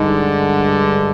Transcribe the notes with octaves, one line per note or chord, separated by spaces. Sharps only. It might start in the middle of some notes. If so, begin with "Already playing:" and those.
Already playing: G2 D3 G#3 D#4